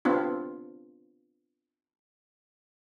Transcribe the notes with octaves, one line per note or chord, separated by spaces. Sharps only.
B3 C4 D4 F4